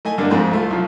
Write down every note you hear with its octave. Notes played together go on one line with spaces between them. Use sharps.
A3 D#5 G#5
G2 D3 A#3 D4
F2 G#2 G#3 A3 C4
C2 A3 F4
B1 F3